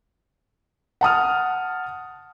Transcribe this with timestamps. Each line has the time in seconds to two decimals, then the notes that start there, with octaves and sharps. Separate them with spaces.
1.01 F#5 A5 D#6 F6